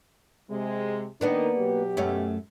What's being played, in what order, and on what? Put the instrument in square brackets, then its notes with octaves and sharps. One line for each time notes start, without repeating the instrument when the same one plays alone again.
[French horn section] C3 G#3
[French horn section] D#3 D#4 [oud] A#3 B3 D4
[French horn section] B2 F#3 G4
[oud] F#2 A3 C#4